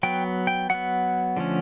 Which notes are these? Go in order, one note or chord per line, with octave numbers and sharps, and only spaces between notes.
F#3 B3 G5
G5
F#3 B3 F#5
D3 F3 A3 C#4